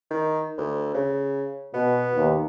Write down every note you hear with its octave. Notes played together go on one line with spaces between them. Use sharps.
D#3
D2
C#3
B2 B3
D#2